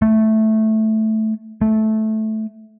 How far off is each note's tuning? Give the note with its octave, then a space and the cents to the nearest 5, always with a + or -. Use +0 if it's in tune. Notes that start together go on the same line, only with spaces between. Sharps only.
A3 -5
A3 -10